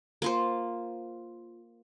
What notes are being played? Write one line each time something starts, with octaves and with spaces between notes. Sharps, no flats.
A#3 F4 C5